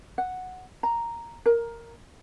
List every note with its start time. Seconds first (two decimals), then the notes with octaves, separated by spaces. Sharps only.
0.18 F#5
0.83 A#5
1.46 A#4